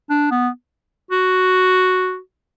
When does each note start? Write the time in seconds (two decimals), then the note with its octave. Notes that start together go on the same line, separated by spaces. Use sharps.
0.10 D4
0.31 B3
1.11 F#4